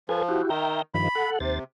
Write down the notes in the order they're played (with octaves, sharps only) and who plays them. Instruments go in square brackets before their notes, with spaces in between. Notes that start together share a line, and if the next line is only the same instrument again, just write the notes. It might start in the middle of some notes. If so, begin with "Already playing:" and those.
[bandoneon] F3 [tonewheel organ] A4 B4 G#5
[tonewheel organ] E4 F#4 G4
[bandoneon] D#3 [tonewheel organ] E5 G5 A#5
[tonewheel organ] G2 D#3 F3 [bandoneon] B5
[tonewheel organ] A4 F#5
[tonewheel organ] D#2 C5 A6 [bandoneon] C3